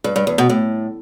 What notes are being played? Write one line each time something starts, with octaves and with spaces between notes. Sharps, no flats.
G2
G2
E2
B2
A2